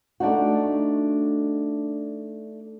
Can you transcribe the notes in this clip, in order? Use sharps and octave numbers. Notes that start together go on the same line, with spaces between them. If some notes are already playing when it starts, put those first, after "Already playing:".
A3 D4 D#4 F#4